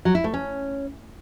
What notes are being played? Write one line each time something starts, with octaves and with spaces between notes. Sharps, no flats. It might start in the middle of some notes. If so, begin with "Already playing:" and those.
F#3
E4
A3
C#4